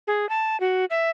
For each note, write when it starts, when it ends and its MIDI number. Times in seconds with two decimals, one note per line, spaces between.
0.07 0.28 68
0.29 0.59 81
0.60 0.85 66
0.90 1.10 76